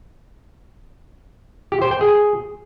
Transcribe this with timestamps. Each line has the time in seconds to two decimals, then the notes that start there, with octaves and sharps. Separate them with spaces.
1.72 G4
1.82 C5
1.91 G5
2.01 G#4